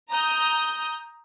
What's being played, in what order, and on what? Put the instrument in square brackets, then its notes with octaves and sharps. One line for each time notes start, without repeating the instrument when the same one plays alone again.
[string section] A#5 D#6 G6